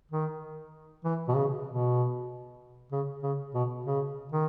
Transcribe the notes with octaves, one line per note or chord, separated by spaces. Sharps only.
D#3
E3
B2
C#3
B2
C#3
C#3
B2
C#3
D#3